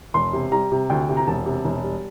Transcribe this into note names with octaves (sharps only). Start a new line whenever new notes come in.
E1 C6
C3
G3 A#5
C3
D2 G5
C3
A#5
E1 A5
C3
E1
G3